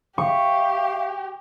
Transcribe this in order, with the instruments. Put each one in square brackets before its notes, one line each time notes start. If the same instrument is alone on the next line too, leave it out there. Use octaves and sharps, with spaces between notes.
[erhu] G4 [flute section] E5 F5 [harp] C#6